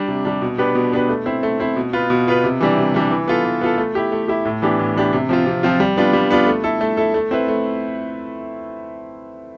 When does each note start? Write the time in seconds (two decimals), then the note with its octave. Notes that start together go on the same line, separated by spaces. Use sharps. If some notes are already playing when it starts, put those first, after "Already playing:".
Already playing: G3 D4
0.08 C3
0.25 G3 D4
0.42 B2
0.58 B3 D4 G4 B4
0.75 B2
0.92 B3 D4 G4 B4
1.09 A3
1.26 C4 E4
1.43 A3
1.60 C4 E4
1.76 B2
1.93 B3 F4 B4
2.10 B2
2.27 B3 F4 B4
2.44 C3
2.61 E3 G3 D4
2.77 C3
2.94 E3 G3 D4
3.11 E3
3.28 B3 F4 A4
3.45 E3
3.61 B3 F4 A4
3.78 A3
3.95 E4 G4
4.12 A3
4.28 E4 G4
4.45 A2
4.62 E3 B3 D4 G4
4.79 A2
4.96 E3 B3 D4 G4
5.13 C3
5.29 F3 C4 F4
5.46 C3
5.63 F3 C4 F4
5.80 G3
5.97 B3 D4 F4
6.13 G3
6.30 B3 D4 F4
6.47 A3
6.64 E4 A4
6.81 A3
6.97 E4 A4
7.14 A3
7.31 C4 E4 B4
7.48 A3